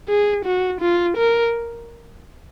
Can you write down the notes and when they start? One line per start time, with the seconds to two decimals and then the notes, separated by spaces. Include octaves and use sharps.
0.08 G#4
0.45 F#4
0.81 F4
1.17 A#4